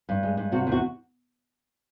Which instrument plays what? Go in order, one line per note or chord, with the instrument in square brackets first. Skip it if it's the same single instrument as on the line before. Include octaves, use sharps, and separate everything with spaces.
[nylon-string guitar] G2
G#3
G2
C3 F#4
E2 F#4